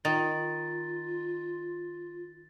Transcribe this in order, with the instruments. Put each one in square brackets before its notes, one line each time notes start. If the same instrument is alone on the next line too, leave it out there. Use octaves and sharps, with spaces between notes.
[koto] D#3 [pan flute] F4 [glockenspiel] A6